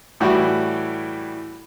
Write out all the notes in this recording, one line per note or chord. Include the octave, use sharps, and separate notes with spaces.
A2 E3 G3 F#4 G4